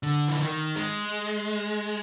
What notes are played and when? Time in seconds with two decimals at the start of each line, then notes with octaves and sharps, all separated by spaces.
0.03 D3
0.28 E3
0.39 D#3
0.76 G#3